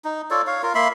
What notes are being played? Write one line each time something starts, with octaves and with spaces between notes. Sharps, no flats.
D#4
F4 A4 C#5 D5
C#5 F5
F4 A#4
A#3 E5 B5 C6